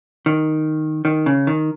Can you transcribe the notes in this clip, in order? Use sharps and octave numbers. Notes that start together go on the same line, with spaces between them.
D#3
D#3
C#3
D#3